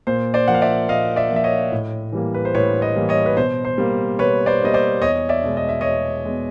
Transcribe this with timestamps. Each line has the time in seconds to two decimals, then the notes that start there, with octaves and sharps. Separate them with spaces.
0.07 A#2 C5
0.34 C5 D5
0.48 F3 A#3 F#5
0.55 F5
0.62 D5 E5
0.89 A#2 D#5 F5
1.16 D5 E5
1.30 F3 A#3
1.36 E5
1.44 C#5 D#5
1.72 A2
2.12 E3 G3 A#3
2.34 B4
2.45 C5
2.55 A2 B4 C#5
2.81 C#5 D#5
2.96 E3 G3 A#3
3.09 C#5 D#5
3.26 B4
3.37 B2 C5
3.65 C5
3.78 G3 A#3
4.19 B2 B4 C#5
4.46 C5 D5
4.61 G3 A#3 D#5
4.74 C5 D5
5.02 E2 C#5 D#5
5.29 D5 E5
5.44 B2 G#3
5.57 D#5
5.69 E5
5.81 E2 C#5 D#5
6.25 B2 G#3